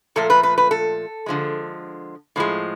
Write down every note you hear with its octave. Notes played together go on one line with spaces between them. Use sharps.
A#2 F3 A3 A4
B4
B4
B4
A4
D3 F3 G#3
A2 F3 G#3